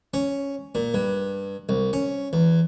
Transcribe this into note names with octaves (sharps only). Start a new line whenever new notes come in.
C#4
A#2
G2
C2
C#4
E2